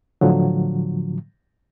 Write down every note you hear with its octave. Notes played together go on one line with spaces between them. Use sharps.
A2 D3 F3 F#3